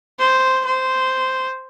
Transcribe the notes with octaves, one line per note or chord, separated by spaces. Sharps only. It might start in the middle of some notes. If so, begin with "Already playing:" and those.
C5
C5